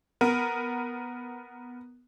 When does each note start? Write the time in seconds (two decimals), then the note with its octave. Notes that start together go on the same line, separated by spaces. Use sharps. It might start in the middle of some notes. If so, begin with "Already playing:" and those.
0.21 B3 A#4